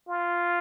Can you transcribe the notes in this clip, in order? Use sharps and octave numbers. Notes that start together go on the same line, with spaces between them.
F4